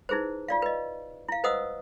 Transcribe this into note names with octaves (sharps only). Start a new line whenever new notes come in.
D#4 E4 G#4 B4 C5
F4 D5 F5
B4 D#5
E4 F5
B4 C5 D#5 F#5 D#6 E6